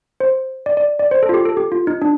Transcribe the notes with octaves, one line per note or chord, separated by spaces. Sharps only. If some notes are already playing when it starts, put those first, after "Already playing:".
C5
D5
D5
D5
C5
A4
F4
G4
A4
G4
F4
D#4
D4